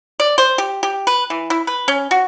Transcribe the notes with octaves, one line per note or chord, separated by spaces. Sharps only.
D5
C5
G4
G4
B4
E3
E4
B4
C#4
F#4